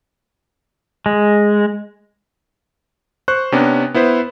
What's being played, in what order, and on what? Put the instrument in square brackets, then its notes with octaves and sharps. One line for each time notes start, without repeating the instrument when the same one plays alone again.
[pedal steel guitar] G#3
[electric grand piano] C5 C#6 F#6
C3 B3 C#4 D4
B3 E4 B4 C5